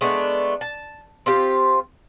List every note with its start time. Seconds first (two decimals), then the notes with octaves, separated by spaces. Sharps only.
0.01 G#3 A3 B3 D4
0.61 A5
1.26 C4 F4 G4